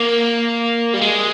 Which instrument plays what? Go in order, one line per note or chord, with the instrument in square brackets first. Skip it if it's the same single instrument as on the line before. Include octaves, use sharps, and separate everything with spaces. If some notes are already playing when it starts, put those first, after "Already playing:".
Already playing: [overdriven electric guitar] A#3
G3
G#3